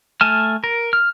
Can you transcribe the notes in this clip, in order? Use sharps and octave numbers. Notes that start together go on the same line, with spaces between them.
A3 G#5 A5 F6
A#4
F6